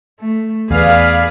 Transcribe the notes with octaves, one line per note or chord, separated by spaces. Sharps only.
A3
E2 G#4 B4 D5 F5